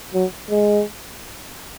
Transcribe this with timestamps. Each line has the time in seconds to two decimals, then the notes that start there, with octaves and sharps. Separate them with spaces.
0.14 F#3
0.50 G#3